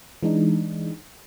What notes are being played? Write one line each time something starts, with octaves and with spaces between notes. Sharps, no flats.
E3 G#3 D4 D#4